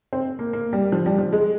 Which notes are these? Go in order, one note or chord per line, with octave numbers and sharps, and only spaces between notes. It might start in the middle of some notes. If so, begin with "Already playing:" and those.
C4
A#3
A#3
G3
F3
G3
F3
G#3